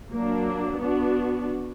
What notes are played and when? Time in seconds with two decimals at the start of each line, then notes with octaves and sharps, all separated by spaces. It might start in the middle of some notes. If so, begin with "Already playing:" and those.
0.10 F#3 A#3 D4
0.78 B3 D4 F#4